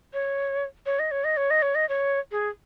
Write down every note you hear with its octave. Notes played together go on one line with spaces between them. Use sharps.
C#5
C#5
D#5
C#5
D#5
C#5
D#5
C#5
D#5
C#5
G#4